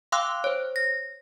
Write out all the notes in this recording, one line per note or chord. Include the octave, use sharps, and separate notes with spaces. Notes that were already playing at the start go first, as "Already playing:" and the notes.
F5 G5 C6 D6 E6 F#6
C5 C#5
A#6